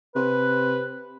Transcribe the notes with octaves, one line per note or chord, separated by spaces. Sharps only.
C3 B4